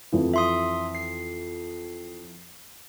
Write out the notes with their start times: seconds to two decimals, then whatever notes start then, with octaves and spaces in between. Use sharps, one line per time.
0.12 F2 E3
0.34 E5 C6 D#6
0.95 C7